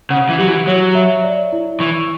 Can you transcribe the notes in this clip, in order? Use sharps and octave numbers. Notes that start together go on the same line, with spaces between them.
C#3 F#5
E3
F#3 G4
E3
F#3 C#5
E5
D5
E4
E3 C#6